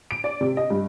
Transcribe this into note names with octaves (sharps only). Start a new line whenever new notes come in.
D7
D5
C3
D#5
G2